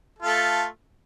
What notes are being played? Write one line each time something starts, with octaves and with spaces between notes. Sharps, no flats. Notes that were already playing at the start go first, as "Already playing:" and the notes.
A3 F4 A4